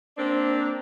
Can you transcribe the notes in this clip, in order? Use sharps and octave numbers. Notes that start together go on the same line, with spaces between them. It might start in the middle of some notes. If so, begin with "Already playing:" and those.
A#3 C4 D4